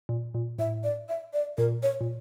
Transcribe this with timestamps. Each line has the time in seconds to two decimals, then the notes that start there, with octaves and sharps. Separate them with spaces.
0.09 A#2
0.35 A#2
0.59 A2 E5
0.84 D5
1.09 E5
1.33 D5
1.58 A#2 A#4
1.83 C#5
2.01 A#2